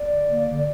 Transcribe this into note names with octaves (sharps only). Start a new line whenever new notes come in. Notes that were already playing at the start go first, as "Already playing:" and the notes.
Already playing: D5
D3
A#3
D3